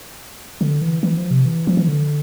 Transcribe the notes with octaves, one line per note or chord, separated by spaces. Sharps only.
D3
E3
E3
F3
C3
E3
F3
E3
D3